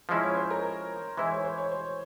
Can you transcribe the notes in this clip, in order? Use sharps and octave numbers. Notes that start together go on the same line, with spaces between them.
F3 G#3 C#4 E4 C5
C#5
C5
A#4
E3 G#3 E4 C5
C#5
C5
C#5
C5